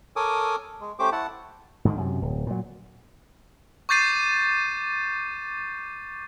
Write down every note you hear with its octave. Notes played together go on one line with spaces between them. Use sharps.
A4 A#4 C#5 G#5 D6 D#6
G#3
A3 C#4 G4 C5 D6
E4 F#5 A5
G#2 D3 D#3
F#2 C3
D1
A#2 F#3
C#6 D6 G6 A6 C7 D#7